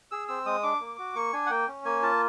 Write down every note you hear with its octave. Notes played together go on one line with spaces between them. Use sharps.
G#4 E6
C4 E6
G#3 D#6
D4 D6
A#3
F#4
A#3 C#6
D4 G#5
F#5
A#3 G5
C#4
A#3 G#5
F4 A5